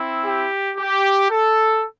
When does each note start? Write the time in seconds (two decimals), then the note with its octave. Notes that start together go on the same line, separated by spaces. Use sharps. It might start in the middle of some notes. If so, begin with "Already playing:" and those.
Already playing: C4 E4
0.24 G4
0.77 G4
1.29 A4